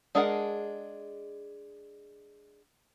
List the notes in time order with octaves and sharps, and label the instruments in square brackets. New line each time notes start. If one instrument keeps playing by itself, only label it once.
[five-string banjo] G#3 D4 G#4 A#4 F#5